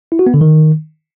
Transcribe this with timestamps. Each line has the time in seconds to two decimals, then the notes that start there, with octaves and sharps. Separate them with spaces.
0.12 E4
0.19 F#4
0.27 B3
0.34 D3
0.41 D#3